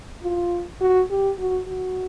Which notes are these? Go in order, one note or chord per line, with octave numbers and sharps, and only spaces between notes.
F4
F#4
G4
F#4
F#4